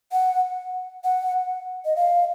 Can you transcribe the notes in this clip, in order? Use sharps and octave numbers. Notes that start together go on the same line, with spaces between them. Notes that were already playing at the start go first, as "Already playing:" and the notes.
F#5
F#5
D#5
F5